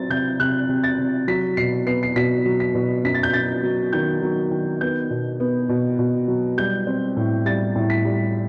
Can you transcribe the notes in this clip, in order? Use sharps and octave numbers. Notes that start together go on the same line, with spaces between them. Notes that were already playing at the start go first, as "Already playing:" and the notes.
Already playing: F#3 C4 A6
C3 G6
C3 F#6
C3
A6
C3
F#3 B6
B2 C7
B3 C7
C7
B2 B6
F#3
B6
B2
F#2 B6
A6
G6
F#2 A6
F#3
D#3 G6
F#3
D#3
B3 G6
B2
B3
B2
B2
F#3
G3 G6
C4
A2
G3 A6
A2
B6
G3